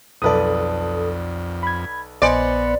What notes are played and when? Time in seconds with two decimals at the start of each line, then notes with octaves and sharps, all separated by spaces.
0.22 B1 F2 A4 B4 D5 D#6
1.63 B5 G#6
2.22 A#1 B3 C5 D5 D#5 G#5 C#7